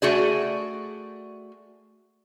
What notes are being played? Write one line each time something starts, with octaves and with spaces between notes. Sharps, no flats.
A3 F#4 G#4 D5